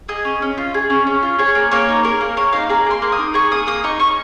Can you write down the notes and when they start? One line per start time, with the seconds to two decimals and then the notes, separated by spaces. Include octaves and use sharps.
0.09 G#4 D#5
0.25 C#4
0.42 C#4
0.58 F4
0.74 G#4
0.90 C#4
1.07 C#4
1.23 F4
1.39 G#4 C#5
1.55 A#3
1.71 A#3 C#5
1.89 D#4
2.04 G#4 A#4
2.21 A#3
2.37 A#3 C#5
2.53 D#4 F5
2.69 G#4 A#5
2.86 A#3 C6
3.02 A#3
3.12 D#6
3.19 D#4
3.34 G#4 C#6
3.51 A#3 D#6
3.67 A#3 D#6
3.84 D#4 C#6
4.00 C#4 C#6